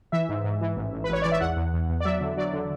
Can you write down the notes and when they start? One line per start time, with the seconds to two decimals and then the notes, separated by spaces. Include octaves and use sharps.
0.12 E3 E5
0.29 G#2
0.44 G#2
0.61 E3
0.76 A1
0.93 A1
1.04 B4
1.10 A1 C#5
1.22 E3 D5
1.32 E5
1.41 E2 F#5
1.57 E2
1.74 E2
1.89 E2
2.01 D5
2.05 F#3 E5
2.21 D3
2.37 F#3 D5
2.53 D3